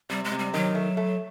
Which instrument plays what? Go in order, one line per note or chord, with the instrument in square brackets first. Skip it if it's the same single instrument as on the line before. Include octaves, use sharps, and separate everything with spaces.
[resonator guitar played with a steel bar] C3 [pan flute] G3
[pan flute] G#3
[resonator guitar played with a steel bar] C3
[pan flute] G3
[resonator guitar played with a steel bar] D#3 [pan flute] F#3
[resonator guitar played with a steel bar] A3
A3